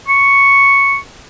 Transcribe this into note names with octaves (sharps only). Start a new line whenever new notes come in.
C#6